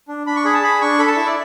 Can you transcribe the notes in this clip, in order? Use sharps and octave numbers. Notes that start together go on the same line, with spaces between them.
D4
D4 B5
C#6
G#4 B5
A5
G#4 B5
D4 C#6
A4 B5
A5
E4 E5
D5